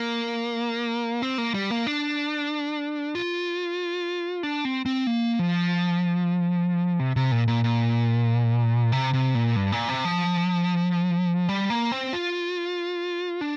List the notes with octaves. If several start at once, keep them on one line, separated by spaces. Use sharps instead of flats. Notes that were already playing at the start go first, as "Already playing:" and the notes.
Already playing: A#3
C4
A#3
G3
A#3
D4
F4
D4
C4
C4
A#3
F3
C3
C3
A#2
A#2
A#2
C3
C3
A#2
G2
A#2
C3
F3
G3
A#3
C4
F4
D4